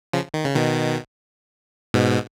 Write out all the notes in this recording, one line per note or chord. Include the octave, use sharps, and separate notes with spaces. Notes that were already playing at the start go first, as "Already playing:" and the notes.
C#3 F3
D#3
C#3
B2 D#3
G#2 B2